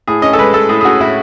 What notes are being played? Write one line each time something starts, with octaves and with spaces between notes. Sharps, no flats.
A2 G#4
C#4 D#5
A4
G#3 B4
G#3 A4
A2 G#4
G#4
C#4 F#4
A2 E4